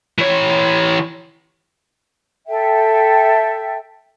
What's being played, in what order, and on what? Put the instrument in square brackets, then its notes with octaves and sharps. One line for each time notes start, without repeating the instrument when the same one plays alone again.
[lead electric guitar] E3 C#5
[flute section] A4 E5 G5